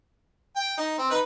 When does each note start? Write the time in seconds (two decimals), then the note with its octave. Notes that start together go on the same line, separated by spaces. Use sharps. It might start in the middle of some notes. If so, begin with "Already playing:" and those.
0.56 G5
0.78 D#4
0.98 C4
1.10 D#4 B4